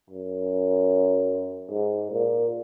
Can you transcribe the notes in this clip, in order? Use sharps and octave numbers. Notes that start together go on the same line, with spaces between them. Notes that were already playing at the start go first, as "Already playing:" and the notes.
F#2
G#2
A#2